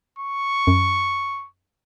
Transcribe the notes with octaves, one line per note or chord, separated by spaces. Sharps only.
C#6
F#2